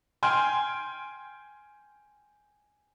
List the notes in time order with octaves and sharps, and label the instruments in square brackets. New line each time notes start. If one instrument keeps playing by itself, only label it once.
[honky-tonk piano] G5 G#5 C6 F6